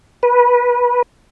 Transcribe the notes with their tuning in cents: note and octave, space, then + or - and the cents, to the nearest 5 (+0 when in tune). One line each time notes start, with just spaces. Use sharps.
B4 -20